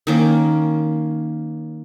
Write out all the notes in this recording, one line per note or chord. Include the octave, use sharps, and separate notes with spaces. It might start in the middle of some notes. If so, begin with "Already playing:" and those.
D#3 A#3 C#4